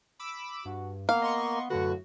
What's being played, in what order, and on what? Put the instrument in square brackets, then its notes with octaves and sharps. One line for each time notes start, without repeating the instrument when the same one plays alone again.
[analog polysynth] B5 D6 E6
[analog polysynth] G2 [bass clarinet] F#4
[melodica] A#3 [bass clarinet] B3 [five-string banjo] F5
[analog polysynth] D#5 C6 C#6
[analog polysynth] F#2 A2 F#4 [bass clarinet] D3 [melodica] B4